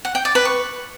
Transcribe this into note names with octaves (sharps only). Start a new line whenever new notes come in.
F#5
G5
D5
B4
C#6